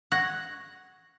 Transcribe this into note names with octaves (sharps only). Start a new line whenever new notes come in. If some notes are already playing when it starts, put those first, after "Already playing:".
F#5 C#6 G#6 A#6